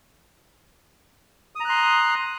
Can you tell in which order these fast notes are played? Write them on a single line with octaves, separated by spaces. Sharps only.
D#6 A#5 F#6 C6